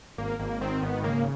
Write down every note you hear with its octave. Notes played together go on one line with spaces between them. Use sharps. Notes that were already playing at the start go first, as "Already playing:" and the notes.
G#1 A#3
G#1 A#3
D#3 C4
G#1 B3
C#3 A#3